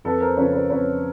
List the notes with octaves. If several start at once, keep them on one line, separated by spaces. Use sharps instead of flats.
F2 A4 B4
A#4 C5
C#3 F3 B4 C#5
C5
B4 C#5
F2 B4 C#5